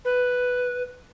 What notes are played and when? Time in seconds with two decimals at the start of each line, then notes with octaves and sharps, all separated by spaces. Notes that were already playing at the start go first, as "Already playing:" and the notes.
0.05 B4